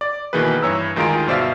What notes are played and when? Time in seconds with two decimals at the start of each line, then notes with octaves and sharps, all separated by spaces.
0.01 D5
0.33 B2 D#3 E3 A#3 G#4 B4
0.63 G2 E3 C#5 A#5 E6
0.96 D2 D#3 G#3 F4 A#5 D7
1.27 G1 B2 C5 D5 E5 F5